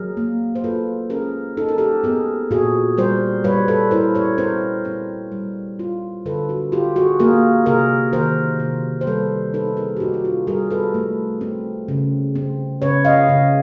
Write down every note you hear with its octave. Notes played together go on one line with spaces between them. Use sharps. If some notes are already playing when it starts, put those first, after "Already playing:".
Already playing: F#3 G#4 A#4
A#3
C5
F4 A4 B4
C#4 G#4 A#4
D#4 A4
A#4
G4 A4
B3 G#4 A#4
A#2 F#4 G#4
G3 A#4 C5
G3 B4 C#5
A4 B4
E4 A#4 C5
B4 C#5
C4 A#4 C5
C4
G3
F4
D3 A4 B4
F#4
F4 G4
F#4 G#4
A#3 G#4 A#4
C3 G#4 A#4
D#3 A#4 C5
C3
C5
G3 A4 B4
D#4 A4 B4
G#4 A#4
G4
D#4 F#4
F#4
F4
G3 G#4 A#4
A4 B4
A3
C4
C#3
C4
C#3 B4 C#5
D#5 F5
C#3